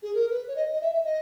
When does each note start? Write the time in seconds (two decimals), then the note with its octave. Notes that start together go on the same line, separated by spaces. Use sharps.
0.02 G#4
0.14 A#4
0.30 B4
0.48 C#5
0.56 D#5
0.73 D#5
0.81 E5
0.93 E5
1.04 D#5